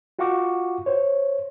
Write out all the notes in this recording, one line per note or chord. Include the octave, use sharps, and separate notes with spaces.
F4 F#4 F5 F#5 C#6 D6
C5 C#5